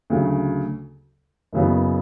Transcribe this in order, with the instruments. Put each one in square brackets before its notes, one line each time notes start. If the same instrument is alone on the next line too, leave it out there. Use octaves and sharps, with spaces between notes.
[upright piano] D2 C#3 F#3
F#1 F#2 C#3 F#3 B3